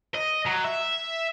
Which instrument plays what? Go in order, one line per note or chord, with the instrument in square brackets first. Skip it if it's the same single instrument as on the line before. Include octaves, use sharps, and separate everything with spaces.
[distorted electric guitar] D#5
F#3
E5